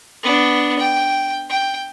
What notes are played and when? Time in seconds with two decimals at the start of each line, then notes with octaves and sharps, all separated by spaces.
0.23 B3 D4
0.78 G5
1.50 G5